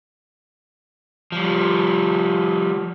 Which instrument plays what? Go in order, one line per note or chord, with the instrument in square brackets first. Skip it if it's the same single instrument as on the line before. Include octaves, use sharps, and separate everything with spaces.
[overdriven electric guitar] F3 G3